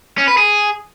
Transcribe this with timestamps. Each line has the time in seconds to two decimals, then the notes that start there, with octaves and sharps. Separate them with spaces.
0.18 C#4
0.28 B4
0.37 G#4